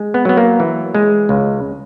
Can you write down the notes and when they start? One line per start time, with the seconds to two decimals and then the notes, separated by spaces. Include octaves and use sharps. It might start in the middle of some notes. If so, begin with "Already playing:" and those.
Already playing: G#3
0.14 B3
0.25 F#3 B3
0.37 A#3
0.60 E3
0.95 G#3
1.29 C#2